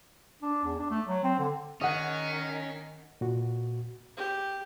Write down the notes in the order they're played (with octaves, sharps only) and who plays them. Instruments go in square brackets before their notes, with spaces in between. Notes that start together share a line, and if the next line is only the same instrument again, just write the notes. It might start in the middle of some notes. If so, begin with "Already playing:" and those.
[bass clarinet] D4
E2
D4
A3
F#3
C4
D3
[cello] D#3 [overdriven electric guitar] C#4 [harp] D#5 F#5
[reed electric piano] A#2 F#4
[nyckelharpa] G4